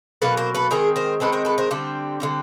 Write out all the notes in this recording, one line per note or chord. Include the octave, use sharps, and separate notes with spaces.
B2 F#3 A#3 A4 B4
A#4 C5
A4 B4
D#3 G#3 C4 G#4 A#4
A#4 C5
D#3 G#3 C4 A4 B4
A#4 C5
A4 B4
A#4 C5
D3 G3 C4
D3 G3 C4